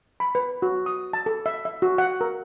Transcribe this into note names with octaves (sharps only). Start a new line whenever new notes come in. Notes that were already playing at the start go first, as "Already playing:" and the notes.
B5
B4
F#4
D#6
A5
A4
E5
E5
F#4
F#5
A#4